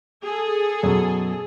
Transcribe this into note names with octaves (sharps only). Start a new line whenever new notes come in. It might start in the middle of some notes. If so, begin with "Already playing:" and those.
G#4 A4
F#2 B2